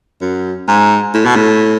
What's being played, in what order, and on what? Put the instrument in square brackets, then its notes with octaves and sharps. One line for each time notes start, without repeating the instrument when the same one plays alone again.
[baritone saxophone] F#2
G#2
A2
B2
A2